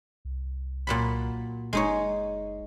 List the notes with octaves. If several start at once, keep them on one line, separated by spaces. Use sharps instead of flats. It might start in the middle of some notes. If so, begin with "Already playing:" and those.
C2
A#2 F#3 B5
F#1 G#3 D#4 C#5